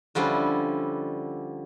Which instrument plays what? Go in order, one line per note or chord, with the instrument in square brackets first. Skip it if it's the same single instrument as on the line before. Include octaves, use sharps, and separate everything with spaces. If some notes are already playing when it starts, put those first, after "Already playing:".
[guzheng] D3 F3 G3 C#4 E4